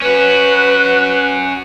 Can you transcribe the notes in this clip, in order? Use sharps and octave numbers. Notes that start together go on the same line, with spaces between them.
C#4 F#4 B4